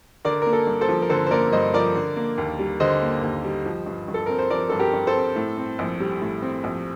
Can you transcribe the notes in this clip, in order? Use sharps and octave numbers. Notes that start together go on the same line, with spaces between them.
D3 A#4 D5
A#3 A#4
A4
G2
A4 C5
F3
A#4
D3 A4 C5
C5
A#3 A#4 D5
G2 C5 D#5
F3 A#4 D5
D3
A#3
D#2
G3
D3 C5 D#5
A#3
D#2
G3
F3
G2
G2
A4
C4 A#4
C5
F3 A#4 D5
G2 A4
G4 A#4
G2
A4 C5
C4
A2
C4
A#1
G3
A2
C4
A#1